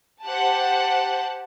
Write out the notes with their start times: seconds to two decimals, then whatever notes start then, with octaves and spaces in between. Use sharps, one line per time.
0.25 G4 C5 F#5 A5